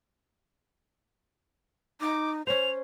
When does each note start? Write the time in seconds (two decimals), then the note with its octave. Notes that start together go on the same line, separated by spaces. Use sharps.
2.01 D#4 D6
2.47 C#4 C5 C#5 F7